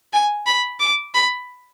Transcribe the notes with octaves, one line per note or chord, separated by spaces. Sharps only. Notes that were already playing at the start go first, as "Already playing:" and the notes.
G#5
B5
D6
B5